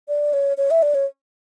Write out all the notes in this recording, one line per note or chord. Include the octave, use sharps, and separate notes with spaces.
D5
C#5
C#5
E5
D5
C#5